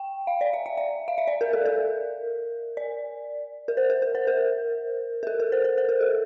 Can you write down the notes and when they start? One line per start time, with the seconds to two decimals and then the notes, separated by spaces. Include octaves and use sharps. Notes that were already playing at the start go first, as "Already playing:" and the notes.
Already playing: G5
0.27 F5
0.41 D5
0.53 E5
0.66 E5
0.77 E5
1.08 F5
1.18 E5
1.27 D5
1.41 A#4
1.53 A4
1.66 A#4
2.77 D5
3.68 A#4
3.77 C5
3.90 A#4
4.02 A#4
4.15 C5
4.27 A#4
5.23 A#4
5.27 A4
5.40 A#4
5.52 C5
5.64 C5
5.78 C5
5.89 A#4
6.01 A4